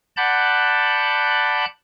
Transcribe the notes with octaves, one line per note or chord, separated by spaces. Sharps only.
D5 F#5 A5 B5 F#6 G6